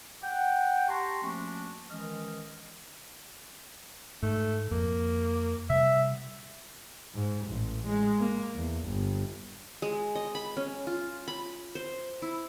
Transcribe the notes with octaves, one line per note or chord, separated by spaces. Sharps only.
F#5 G5
G4 A5 A#5 C6 C#6
F3 A3 A#3 C#4 D4 F#4
D#3 E3 G#3 C#4 D#5 F6
G#2 A3
F2 A#3
C3 G3 E5
G#2
A1
G#3
A#3
E2
G1
G#3
D#5
B5
C#4
F4
B5
C5
E4